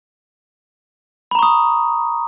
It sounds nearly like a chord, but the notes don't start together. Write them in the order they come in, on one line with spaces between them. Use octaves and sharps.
B5 A#5 C#6 D#6